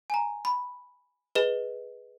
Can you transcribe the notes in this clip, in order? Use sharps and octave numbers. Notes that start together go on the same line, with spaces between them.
G#5
A#5
B5
G#4 B4 D#5